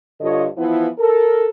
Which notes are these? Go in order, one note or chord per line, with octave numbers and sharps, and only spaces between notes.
G2 D3 F4 A4 C#5 D#5
E3 F3 B3 E4
A4 A#4